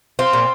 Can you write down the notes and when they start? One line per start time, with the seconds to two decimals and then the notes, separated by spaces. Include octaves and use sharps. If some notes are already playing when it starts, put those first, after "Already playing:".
0.19 C4 F4
0.33 A#2